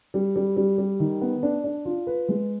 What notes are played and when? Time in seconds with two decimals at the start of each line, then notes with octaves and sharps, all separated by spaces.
0.14 G3
0.36 G3
0.57 G3
0.78 G3
1.00 D#3
1.21 B3
1.43 D4
1.64 D4
1.85 F4
2.07 B4
2.28 G#3